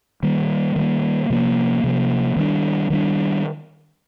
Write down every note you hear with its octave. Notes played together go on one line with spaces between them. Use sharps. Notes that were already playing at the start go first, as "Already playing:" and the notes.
D#3 G3 A#3
D#3 G3 A#3
C3 F3 A#3
C3 F3 A#3
D#3 G3 A#3 D4
D#3 G3 A#3 D4